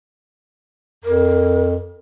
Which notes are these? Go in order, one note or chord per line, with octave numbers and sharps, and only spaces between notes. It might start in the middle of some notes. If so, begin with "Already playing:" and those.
F2 A#4